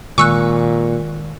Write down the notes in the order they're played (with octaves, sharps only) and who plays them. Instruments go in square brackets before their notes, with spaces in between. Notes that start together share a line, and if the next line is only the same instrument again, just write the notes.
[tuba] A#2 [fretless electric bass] D#3 G#3 [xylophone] G#5 E6 F#6 [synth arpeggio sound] C#6